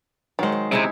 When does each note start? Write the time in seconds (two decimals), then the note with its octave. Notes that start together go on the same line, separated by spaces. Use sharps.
0.39 D#3 F#3 G#3 C5
0.52 C5
0.72 C3 G#3 D#4 E4